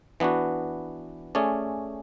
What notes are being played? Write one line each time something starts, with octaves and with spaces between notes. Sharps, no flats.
E3 B3 D4 F#4
A3 C#4 G#4 D5